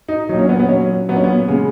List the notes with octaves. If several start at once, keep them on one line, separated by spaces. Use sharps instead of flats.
D#4
A#2 F#3 D#4
C#4
B3
B3
A#2 F#3 C#4
A#2 F#3 B3
C#4
B3
C#3 G#3